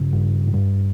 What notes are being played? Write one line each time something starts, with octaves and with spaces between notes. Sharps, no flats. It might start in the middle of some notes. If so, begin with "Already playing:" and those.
Already playing: G2 C#3
G2
G#2
G2